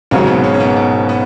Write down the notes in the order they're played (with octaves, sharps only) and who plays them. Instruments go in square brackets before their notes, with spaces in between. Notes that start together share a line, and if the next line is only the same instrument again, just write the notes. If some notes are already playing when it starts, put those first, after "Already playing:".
[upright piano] G#1 G#2 F#3 [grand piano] C#3 C#4
[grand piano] B2 B3
C#3 C#4
C#4
B2 B3
B2 B3
B2 B3